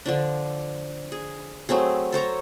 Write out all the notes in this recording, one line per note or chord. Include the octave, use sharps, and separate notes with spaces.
D3 F3 D4
G#4
F#3 A3 C4 G#4
A4 C5 C#5 A#5